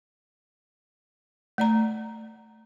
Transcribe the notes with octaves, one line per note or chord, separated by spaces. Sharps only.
A3 D5 A#5